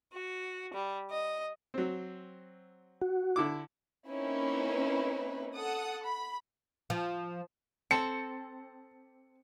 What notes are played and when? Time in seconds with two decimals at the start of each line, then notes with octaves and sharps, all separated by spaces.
0.13 F#4
0.73 G3
1.11 D#5
1.74 F#3 C4
3.02 F#4
3.36 D3 E4 D6
4.09 A#3 C4 C#4 D#4 E4 B4
5.54 A4 F#5 D#6
6.05 B5
6.90 F3
7.91 C4 A4 C#7